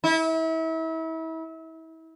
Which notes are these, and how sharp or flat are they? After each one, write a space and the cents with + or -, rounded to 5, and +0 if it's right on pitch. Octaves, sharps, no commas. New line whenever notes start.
E4 -35